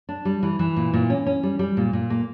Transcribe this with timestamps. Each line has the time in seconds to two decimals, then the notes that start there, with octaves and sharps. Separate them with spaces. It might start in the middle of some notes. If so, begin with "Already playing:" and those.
0.09 D4
0.25 G3
0.43 E3
0.59 E3
0.77 A#2
0.93 A#2
1.10 C#4
1.27 C#4
1.43 G3
1.59 G3
1.77 A#2
1.93 A#2
2.10 A#3